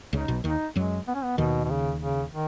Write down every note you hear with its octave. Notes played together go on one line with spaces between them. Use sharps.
C#2 C#3 D#4
B1 B2
D#2 D#3 D#4
F#2 F#3 G#3
B3
C#4
B3
D#2 B2 D#3
B2
C#3
C#3
D#3